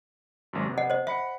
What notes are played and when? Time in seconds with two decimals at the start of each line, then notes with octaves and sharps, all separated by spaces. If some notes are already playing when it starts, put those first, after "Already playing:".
0.53 G#1 F#2
0.65 C3 B3
0.78 D#5 F#5
0.90 C5 D#5
1.07 E5 F#5 B5 C#7